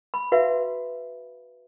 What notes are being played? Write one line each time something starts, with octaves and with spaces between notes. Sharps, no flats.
B5
F#4 B4 E5 F5